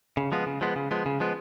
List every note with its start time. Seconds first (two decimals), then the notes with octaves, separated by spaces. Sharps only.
0.17 C#3
0.32 F3 G#3 B3
0.47 C#3
0.61 F3 G#3 B3
0.76 C#3
0.91 F3 G#3 B3
1.06 C#3
1.20 F3 G#3 B3